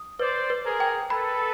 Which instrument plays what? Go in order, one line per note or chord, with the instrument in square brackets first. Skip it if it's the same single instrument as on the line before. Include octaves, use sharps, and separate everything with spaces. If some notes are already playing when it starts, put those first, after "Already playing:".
Already playing: [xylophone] D#6
[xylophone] B4 [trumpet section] C5 D5
[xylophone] B4
[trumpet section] G#4 A#4
[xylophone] G5
[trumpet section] A4 B4 [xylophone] B5